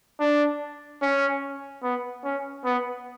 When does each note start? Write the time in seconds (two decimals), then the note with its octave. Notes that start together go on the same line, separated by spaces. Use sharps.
0.20 D4
1.02 C#4
1.83 B3
2.24 C#4
2.65 B3